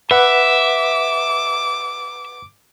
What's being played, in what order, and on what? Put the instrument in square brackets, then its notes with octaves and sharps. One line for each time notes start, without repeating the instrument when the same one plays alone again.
[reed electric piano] B4 F#5 [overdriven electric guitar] E5 [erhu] D6